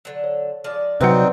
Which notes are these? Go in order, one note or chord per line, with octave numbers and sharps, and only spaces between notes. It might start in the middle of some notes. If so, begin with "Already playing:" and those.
D3 F#3
C#5
F3 G#3 D5
C3 F#3 C4 D4 D#4 F4 B4 F#5